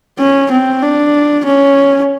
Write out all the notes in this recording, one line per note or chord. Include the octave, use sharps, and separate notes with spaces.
C#4
C4
D4
C#4